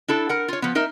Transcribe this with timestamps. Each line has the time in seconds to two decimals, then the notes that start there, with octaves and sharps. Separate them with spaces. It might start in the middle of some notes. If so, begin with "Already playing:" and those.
0.08 D4 E4 A4
0.29 A#4 F#5
0.48 F4 C#5
0.62 F3 B3
0.75 D#4 A#4 E5